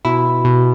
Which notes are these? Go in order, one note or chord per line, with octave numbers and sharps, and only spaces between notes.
B2 E4
B2